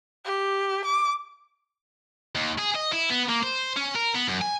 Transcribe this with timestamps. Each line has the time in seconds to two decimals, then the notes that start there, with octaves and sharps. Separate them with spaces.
0.25 G4
0.85 D6
2.35 D#2
2.59 G#4
2.76 D#5
2.93 E4
3.10 B3
3.29 A#3
3.43 C5
3.76 C#4
3.95 A#4
4.15 B3
4.28 F#2
4.42 G#5